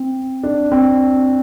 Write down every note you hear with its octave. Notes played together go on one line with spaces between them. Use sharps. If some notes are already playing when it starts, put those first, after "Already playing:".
Already playing: C4
D4
C4